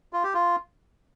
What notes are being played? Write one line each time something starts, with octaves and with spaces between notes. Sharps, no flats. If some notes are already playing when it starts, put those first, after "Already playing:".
F4
G4
F4